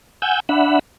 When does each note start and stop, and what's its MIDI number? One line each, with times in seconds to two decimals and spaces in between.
0.22 0.40 78
0.22 0.40 80
0.22 0.40 88
0.22 0.40 91
0.49 0.79 62
0.49 0.79 76
0.49 0.79 78
0.49 0.79 83